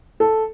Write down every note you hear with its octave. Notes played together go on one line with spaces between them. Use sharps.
A4